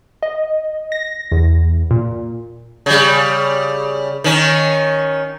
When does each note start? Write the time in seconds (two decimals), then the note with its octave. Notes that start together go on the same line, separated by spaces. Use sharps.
0.23 D#5
0.92 A#6
1.32 E2
1.91 A#2
2.86 C#3 G3
4.24 D#3 C#4